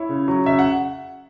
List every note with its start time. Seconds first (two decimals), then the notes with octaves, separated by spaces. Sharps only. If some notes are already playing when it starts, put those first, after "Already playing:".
Already playing: E4 C#5
0.09 C#3
0.28 F#3
0.46 C#3 E5
0.59 F#5